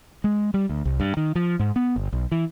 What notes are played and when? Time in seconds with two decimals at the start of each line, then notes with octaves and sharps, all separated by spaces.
0.24 G#3
0.54 G3
0.69 D2
0.85 C2
1.00 G2
1.17 D#3
1.35 F3
1.59 G#2
1.76 B3
1.96 G1
2.13 B1
2.32 E3